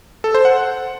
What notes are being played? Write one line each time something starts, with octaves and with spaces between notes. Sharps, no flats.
A4
C5
F#5